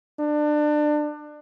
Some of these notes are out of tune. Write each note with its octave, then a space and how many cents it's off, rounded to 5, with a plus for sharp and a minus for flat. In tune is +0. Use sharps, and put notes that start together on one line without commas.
D4 +25